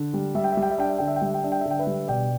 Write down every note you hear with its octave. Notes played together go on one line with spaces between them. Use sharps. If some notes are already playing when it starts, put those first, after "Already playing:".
Already playing: D3
G3
G3 E5
G5
E5
G3
G5
E5
D4 G5
E5
D3 G5
E5
G5
G3 E5
G5
D4 E5
G5
E5
D3
G5
B4 E5
G3
B2 D5 G5